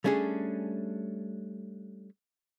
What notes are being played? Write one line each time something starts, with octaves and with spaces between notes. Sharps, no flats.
G3 A3 C#4 D4 G#4